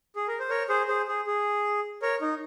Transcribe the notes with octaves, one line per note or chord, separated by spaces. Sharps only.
G#4
A#4
C5
A#4 C#5
G#4 C5
G#4 C5
G#4
G#4
A#4 C#5
D#4